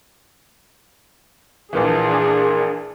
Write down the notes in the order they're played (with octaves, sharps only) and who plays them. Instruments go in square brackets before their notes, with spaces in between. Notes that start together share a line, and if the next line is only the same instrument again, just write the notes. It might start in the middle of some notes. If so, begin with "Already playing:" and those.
[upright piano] A#1 A#2 E3 [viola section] D4 G#4